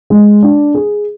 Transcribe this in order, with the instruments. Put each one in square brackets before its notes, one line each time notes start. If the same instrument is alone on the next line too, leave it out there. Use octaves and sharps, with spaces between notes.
[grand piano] G#3
D4
G#4